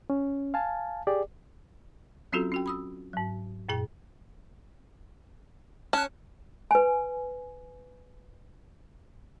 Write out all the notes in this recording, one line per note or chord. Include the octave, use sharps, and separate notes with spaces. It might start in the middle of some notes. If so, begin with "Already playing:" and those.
C#4
F5 G#5 A5
G4 G#4 D5
F#3 C4 C#4 F4 F#4 A4
C#4 F#4 G5
B5 D#6 E6
G#2 F#3
F#2 A#2 G#4 G5
C#4 A5 F#6
B4 G#5